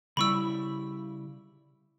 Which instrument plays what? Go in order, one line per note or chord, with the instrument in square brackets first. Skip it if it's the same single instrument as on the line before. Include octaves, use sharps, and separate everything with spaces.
[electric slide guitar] C#3 G3 E4 [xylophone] B5 C#6 E6